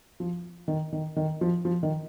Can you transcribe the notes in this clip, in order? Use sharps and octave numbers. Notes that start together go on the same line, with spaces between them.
F3
D#3
D#3
D#3
F3
F3
D#3